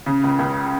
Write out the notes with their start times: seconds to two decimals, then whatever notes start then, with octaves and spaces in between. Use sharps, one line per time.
0.06 C#3
0.23 C#2
0.39 C#2